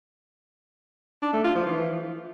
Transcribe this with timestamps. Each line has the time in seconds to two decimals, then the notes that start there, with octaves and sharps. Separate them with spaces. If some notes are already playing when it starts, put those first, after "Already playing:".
1.22 D4
1.33 A3
1.44 F4
1.55 F3
1.66 E3